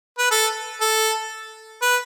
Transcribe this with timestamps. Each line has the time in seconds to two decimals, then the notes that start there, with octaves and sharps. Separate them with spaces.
0.18 B4
0.31 A4
0.81 A4
1.82 B4